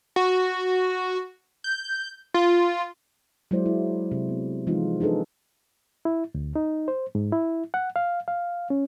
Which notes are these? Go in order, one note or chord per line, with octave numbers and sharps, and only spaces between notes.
F#4
G6
F4
F#3 G#3 E4 C5 D5
E4
C3
B3
E3 F3 G#3 C4 D#4 F4
D4 D#4 G#4 A4 B4
E4
D2
D#4
C5
G#2
E4
F#5
F5
F5
C#4